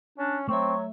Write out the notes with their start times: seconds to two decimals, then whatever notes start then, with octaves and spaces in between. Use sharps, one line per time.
0.18 C#4 D4
0.49 F#3 A3 C4 E5 C#6